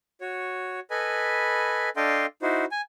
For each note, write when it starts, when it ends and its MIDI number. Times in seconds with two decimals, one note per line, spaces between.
0.21 0.80 66
0.21 0.80 73
0.91 1.89 69
0.91 1.89 71
0.91 1.89 75
0.91 1.89 80
0.91 1.89 83
1.96 2.26 62
1.96 2.26 69
1.96 2.26 75
1.96 2.26 77
1.96 2.26 79
1.96 2.26 84
2.42 2.65 63
2.42 2.65 64
2.42 2.65 66
2.42 2.65 72
2.71 2.81 80